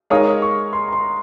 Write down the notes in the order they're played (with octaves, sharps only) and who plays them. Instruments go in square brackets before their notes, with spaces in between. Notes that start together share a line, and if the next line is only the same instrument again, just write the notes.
[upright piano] G#3 D#4 A#4 C#5 F5 [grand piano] D#6
[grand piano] C#6
C6
A#5
C6